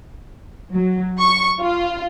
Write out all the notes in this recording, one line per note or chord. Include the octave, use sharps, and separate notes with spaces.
F#3
C#6
F4